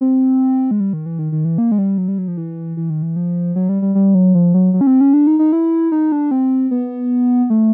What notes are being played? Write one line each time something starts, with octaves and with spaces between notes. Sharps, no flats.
C4
G#3
G3
D#3
E3
D#3
D#3
E3
A#3
G#3
G3
F#3
G3
F#3
F3
E3
E3
D#3
E3
F3
F#3
G3
G3
G3
F#3
F3
F#3
F#3
C#4
C4
C#4
D4
D#4
D#4
E4
D#4
D4
C4
B3
A3